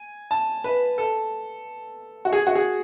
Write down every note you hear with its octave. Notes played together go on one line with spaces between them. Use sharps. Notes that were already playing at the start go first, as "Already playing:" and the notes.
Already playing: G#5
A5
B4
A4
F#4
G#4
F#4
G#4